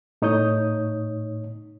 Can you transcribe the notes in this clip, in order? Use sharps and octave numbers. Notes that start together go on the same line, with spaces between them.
A2 D#4 C#5 D#6 G6